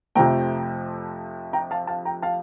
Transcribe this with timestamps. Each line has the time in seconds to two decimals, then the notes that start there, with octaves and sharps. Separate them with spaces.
0.15 F2 C3 F3 A3 G5 A#5
1.53 G5 A#5
1.71 F5 A5
1.87 F5 A5
2.05 G5 A#5
2.22 F5 A5